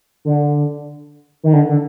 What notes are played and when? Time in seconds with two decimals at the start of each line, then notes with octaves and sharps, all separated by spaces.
0.25 D3
1.44 D#3
1.53 D3
1.69 D3